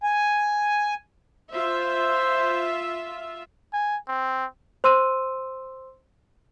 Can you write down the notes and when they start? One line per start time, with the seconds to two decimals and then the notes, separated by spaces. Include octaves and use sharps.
0.04 G#5
1.52 F4 C5 E5
3.73 G#5
4.08 C4
4.84 C5 C6 E6 D#7